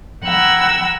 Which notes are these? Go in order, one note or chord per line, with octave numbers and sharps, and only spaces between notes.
F#5 G5 A#5 B5 E6 G#6